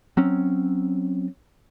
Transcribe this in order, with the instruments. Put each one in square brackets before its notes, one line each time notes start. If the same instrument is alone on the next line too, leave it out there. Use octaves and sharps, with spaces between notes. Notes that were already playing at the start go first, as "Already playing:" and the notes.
[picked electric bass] F#3 C4 C#4